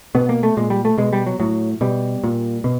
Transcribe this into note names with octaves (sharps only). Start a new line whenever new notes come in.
B2 B3
A#3
A3
A#2 G#3
G3
A3
B2 G#3
G3
F#3
A2 F#3
B2 G3
A#2
B2